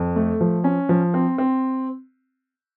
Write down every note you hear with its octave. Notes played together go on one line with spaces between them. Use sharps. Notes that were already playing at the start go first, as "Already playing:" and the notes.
Already playing: F2
A3
F3
C#4
F3
C4
C4